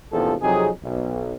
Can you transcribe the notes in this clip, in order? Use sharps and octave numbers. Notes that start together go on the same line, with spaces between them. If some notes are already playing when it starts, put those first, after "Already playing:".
A#1 E2 G#2 C3 F3 A4
F2 C3 F#3 D#4 G#4
B1